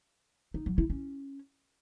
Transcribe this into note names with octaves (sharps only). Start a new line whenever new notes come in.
D#4
F#3
E4
C#4